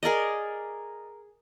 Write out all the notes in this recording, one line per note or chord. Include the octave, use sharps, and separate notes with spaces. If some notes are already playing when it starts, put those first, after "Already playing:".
G#4 A#4 D5 D#5